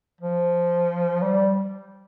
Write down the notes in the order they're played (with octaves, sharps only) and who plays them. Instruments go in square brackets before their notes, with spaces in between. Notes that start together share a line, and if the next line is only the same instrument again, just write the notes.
[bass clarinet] F3
G3